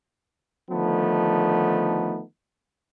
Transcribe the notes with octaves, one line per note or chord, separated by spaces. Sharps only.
D3 D#3 F3 A3 B3 D#4